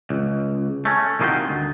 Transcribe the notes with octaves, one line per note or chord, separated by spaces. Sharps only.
C#2
A3 C#4
C2 D#3 D#4 F4 F#4 G5
D2